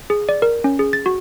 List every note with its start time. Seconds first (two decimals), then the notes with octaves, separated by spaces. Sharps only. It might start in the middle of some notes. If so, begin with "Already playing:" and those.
0.10 G#4
0.29 D5
0.42 A#4
0.64 C#4
0.79 G#4
0.93 A6
1.06 F#4